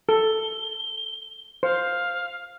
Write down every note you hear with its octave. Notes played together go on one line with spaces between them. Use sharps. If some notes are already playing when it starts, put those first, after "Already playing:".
A4 G7
C5 F5